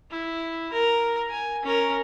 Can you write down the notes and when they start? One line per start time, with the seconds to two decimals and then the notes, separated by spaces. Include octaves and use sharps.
0.11 E4
0.73 A#4
1.30 G#5
1.63 C#4 A#4